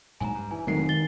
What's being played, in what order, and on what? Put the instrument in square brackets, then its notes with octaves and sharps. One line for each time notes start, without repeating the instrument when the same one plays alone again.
[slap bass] A#1 G#2 F#3 [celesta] G#5 A#5
[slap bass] G2
[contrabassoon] E3 [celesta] G#5
[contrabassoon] F1 [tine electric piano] D#3 C7 [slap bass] F#3 G#3
[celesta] A6 G7